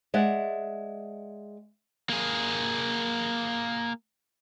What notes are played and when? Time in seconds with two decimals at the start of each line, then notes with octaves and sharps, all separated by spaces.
0.14 G#3 D5 E5 F#5
2.09 A#3 G#4